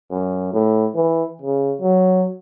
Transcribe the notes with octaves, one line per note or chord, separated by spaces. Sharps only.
F#2
A2
E3
C#3
F#3